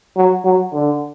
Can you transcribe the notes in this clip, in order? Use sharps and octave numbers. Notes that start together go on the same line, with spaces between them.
F#3
F#3
D3